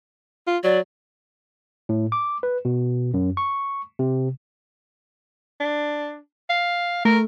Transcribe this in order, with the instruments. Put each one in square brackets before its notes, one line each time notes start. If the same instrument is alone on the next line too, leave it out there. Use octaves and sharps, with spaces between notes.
[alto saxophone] F4
[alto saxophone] F#3 [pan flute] D5
[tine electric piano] A2
D6
B4
B2
F#2
C#6
C3
[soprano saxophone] D4
F5
[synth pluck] A3 [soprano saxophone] A#4